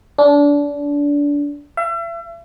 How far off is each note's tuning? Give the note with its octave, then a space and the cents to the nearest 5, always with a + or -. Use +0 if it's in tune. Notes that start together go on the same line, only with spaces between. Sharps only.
D4 -25
E5 +40